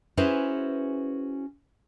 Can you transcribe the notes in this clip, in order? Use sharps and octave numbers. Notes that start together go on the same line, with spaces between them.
C#4 E4 F#4 G#4 B4 C5